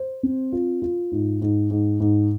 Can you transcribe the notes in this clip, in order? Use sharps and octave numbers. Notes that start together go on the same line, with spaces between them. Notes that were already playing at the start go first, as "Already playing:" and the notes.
Already playing: C5
C4
F4
F4
G#2
G#2
G#2
G#2